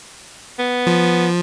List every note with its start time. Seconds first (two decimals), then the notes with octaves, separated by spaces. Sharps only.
0.59 B3
0.87 F3